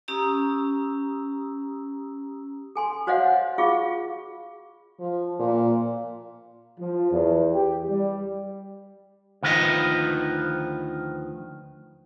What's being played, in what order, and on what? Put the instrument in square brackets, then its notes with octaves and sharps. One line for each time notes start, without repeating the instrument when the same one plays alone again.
[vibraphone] C#4 G4 A#5 D#6 E6
[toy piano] A4 G#5 C6
F#4 C5 C#5 D#5 F5 F#5
F4 G#4 F5 C#6
[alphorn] F3
A#2
[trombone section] F3
E2
G4
G3
[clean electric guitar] D2 D#3 F3 B4 D#5